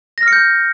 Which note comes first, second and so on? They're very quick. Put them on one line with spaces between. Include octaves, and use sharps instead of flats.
A#6 F6 C#7 G6